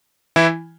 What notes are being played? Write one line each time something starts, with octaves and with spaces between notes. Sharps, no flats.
E3 E4